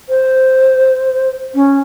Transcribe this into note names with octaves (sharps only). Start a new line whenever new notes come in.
C5
C#4